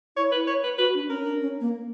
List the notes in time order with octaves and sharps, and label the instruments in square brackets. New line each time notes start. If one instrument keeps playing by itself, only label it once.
[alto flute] E4 [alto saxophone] C#5
[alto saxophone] B4
C#5
B4
[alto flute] F#4 [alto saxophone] B4
[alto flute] D4
[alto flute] C#4 [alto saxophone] A#4
[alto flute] D4
C#4
A#3